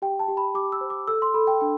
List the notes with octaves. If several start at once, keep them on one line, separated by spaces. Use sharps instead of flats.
G4 G5
A5
G4
B5
G4 D6
E6
C5
D6
A4 E6
C6
A4 B5
G5
D4 G5